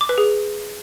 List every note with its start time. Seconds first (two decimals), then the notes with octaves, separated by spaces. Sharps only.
0.01 D6
0.09 B4
0.18 G#4